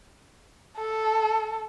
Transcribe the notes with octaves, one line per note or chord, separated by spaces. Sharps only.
A4